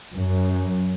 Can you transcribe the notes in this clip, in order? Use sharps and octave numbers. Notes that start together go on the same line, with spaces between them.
F#2